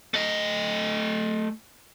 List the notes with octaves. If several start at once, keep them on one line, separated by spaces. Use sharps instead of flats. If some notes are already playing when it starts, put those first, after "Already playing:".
A3 D#5